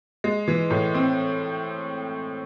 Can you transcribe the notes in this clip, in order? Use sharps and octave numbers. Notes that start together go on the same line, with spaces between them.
G#3
E3
A2
C4